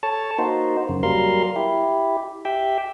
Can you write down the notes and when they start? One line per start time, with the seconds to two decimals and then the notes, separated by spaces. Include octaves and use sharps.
0.03 A4 C#5 A5
0.39 A#3 D#4 F#4 C5
0.89 F#2 C#3
1.03 F#3 G3 A#3 A#4 F5 C6
1.56 E4 G4
2.45 G4 E5 G5